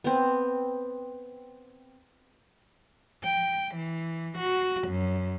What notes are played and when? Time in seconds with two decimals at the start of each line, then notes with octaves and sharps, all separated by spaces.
0.04 B3 C4
3.24 G5
3.74 E3
4.38 F#4
4.87 F#2